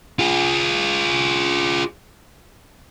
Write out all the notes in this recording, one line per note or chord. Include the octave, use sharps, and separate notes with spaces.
F4 G#4